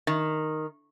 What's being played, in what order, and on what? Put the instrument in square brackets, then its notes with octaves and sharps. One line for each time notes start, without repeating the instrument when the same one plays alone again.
[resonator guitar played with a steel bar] D#3